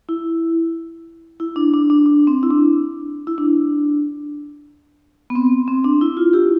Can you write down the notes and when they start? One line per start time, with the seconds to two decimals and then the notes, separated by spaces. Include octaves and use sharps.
0.09 E4
1.40 E4
1.56 D4
1.73 D4
1.90 D4
2.06 D4
2.27 C4
2.43 E4
2.50 D4
3.27 E4
3.38 D4
5.30 B3
5.36 C4
5.68 C4
5.84 D4
6.01 E4
6.17 F4
6.33 E4 G4